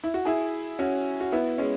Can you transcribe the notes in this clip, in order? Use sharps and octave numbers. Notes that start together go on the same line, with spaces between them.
E4
F#4
E4 G#4
C#4 F#4
F#4
B3 E4
G#3 C#4